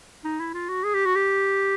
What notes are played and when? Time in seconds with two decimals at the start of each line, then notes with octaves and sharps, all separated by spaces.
0.25 D#4
0.40 E4
0.54 F4
0.69 F#4
0.84 G#4
0.95 G4
1.06 F#4
1.16 G4